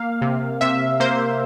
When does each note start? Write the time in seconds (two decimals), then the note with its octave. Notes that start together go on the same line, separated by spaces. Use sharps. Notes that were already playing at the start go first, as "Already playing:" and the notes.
Already playing: A#3 F5
0.22 C3
0.61 C3 E5
1.00 A#3 C5